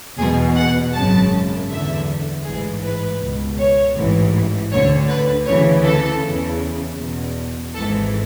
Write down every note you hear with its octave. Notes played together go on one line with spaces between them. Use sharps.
E2 B2 G#4
F#5
G#1 F#2 C#3 A5
E2 D3 E5
A1 G#2 E3 G#4
B4
C#2 B2
C#5
A1 G#2 E3
D2 D3 C#5
B4
D2 C#3 E3 C#5
A4
E2 C#3 E3
E2 B2
G#1 G#2 E3 A4